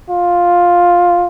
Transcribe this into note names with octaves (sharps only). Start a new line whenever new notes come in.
F4